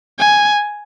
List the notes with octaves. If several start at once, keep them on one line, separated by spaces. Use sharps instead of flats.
G#5